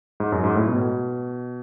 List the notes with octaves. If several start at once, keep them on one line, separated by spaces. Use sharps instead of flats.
G#2
F#2
G#2
A2
B2